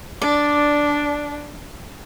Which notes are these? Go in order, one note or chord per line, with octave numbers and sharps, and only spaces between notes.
D4 D5